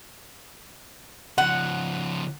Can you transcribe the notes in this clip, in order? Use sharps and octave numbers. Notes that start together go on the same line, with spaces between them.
C#3 F3 F#5